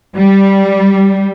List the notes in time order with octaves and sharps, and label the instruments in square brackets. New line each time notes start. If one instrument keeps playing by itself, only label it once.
[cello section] G3